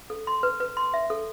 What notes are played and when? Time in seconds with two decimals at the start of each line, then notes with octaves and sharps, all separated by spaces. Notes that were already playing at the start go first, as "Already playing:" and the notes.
0.10 A4
0.27 C6
0.43 B4
0.60 B4
0.77 C6
0.94 E5
1.10 A4